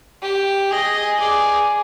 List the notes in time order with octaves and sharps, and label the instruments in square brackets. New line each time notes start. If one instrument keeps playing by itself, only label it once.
[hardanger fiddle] G4
[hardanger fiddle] G#4 [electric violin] D#5
[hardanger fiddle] G#4 [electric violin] D5